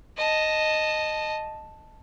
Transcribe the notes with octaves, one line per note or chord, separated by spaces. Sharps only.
D#5 A5